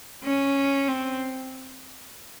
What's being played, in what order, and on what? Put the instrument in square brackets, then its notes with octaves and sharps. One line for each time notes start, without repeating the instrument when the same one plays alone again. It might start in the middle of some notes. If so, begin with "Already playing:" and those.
[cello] C#4
C4